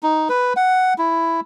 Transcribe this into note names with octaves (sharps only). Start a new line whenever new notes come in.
D#4
B4
F#5
E4